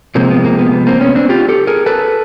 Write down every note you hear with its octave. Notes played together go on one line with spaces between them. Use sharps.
C3 F3 G#3 A#3 C4
B3
A#3
B3
B3
A#3 C4
B3 C#4
C4 D4
F4 G4
G4 A4
G#4 A#4
A4 B4